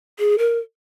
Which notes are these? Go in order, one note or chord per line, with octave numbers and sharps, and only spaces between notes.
G#4
A#4